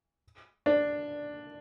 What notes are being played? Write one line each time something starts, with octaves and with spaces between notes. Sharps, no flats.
D4